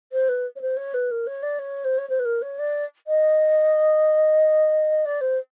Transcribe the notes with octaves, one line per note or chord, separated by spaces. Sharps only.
C5
B4
C#5
C5
C#5
B4
A#4
C#5
D5
C#5
C5
C#5
C5
B4
A#4
C#5
D5
D#5
D5
C5